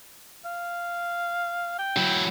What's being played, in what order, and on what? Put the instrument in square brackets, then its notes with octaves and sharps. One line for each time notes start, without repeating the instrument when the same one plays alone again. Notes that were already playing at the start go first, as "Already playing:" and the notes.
[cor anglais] F5
G5
[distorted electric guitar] F#3 E4